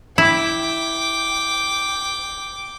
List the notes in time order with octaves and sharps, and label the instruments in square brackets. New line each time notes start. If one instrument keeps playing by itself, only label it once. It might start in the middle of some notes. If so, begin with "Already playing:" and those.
[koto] E4 [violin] G5 D6